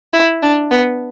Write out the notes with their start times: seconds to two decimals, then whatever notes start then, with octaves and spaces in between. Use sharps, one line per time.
0.13 E4
0.42 D4
0.71 B3